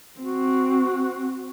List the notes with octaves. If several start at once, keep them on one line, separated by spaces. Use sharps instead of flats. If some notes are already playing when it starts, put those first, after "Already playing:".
C4 F#4